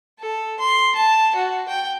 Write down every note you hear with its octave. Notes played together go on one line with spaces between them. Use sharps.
A4
C6
A5
F#4
G5